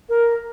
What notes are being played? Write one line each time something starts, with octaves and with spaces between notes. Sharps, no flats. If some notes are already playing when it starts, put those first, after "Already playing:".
A#4